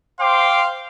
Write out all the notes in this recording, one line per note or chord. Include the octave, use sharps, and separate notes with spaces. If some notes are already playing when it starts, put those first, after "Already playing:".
C5 F5 G5 C6 D6